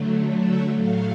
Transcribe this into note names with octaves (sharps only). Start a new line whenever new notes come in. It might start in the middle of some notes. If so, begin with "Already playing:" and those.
Already playing: D3 F#3 A3
E5
A2 F#3 A3 F5